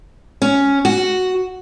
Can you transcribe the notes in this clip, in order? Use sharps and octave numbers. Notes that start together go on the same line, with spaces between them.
C#4
F#4